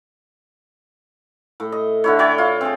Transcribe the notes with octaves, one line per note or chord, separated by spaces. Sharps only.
A2
D#5
D3 E4 C#5
C#5 D5 E5 G5
F4
C4 G#4